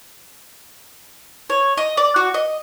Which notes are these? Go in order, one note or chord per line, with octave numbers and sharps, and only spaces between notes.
C#5
D#5
D5
F#4
D#5